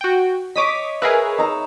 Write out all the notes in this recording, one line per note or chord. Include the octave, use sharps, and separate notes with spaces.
F#4 G5
C#5 D#5 D6 D#6 B6
G#4 A#4 B4 E5 F5 B5
D#4 A#5 E6